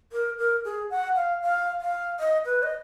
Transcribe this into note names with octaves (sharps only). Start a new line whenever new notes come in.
A#4
A#4
G#4
F#5
F5
F5
F5
D#5
B4
D#5